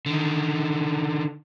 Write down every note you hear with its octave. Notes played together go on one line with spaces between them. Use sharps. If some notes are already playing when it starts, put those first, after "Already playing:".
D3 D#3